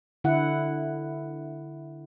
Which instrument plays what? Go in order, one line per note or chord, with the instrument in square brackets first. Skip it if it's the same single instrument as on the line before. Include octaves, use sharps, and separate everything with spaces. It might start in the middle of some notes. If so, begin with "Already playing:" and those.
[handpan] D3 E4 F#5